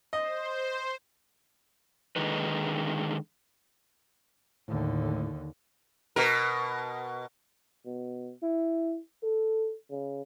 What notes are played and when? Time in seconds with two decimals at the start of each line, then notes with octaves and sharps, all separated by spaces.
0.13 C5 D#5
2.16 D3 D#3 G#3 D#4 B4
4.68 D#2 A2 D3
6.16 B2 A#4
7.86 B2
8.43 E4
9.23 A4
9.91 C#3